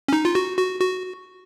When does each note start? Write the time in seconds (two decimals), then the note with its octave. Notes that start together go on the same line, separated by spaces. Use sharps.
0.08 C#4
0.13 D#4
0.25 F4
0.35 F#4
0.57 F#4
0.80 F#4